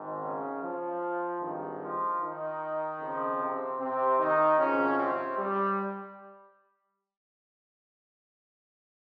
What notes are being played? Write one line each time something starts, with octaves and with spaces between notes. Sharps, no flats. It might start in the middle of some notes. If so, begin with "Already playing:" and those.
Already playing: G#1 G#2 D#3
C#3 C#4
F3 F4
G#1 G2 D#3
F3 F4
D#3 D#4
F2 C#3 F3
C3 C4
C3 C4
D#3 D#4
G#1 G#2 C#3 F3 C#4
C3 C4
G3